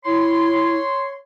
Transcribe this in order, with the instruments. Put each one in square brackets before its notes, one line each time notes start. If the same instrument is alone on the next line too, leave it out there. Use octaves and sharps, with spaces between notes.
[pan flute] E4 [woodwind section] C#5 C6